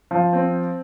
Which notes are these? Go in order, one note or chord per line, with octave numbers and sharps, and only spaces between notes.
F3
C4